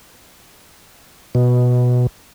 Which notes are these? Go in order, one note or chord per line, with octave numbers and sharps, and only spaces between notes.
B2